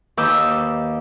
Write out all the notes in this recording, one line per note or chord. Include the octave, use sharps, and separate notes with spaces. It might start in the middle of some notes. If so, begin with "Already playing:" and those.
D#2 B4 D#5 D6 E6 G6